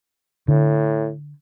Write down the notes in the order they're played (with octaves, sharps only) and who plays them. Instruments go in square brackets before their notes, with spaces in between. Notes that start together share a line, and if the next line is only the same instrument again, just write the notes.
[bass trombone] A2 [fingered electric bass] D3